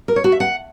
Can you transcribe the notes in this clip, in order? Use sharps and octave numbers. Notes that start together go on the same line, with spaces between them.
A#4
C#5
F#4
E5
F#5